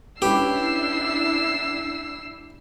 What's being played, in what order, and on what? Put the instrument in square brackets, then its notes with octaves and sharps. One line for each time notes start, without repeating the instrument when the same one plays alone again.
[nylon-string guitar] C#4 B4 [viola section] D4 E4 [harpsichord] G4 [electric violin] E6 C7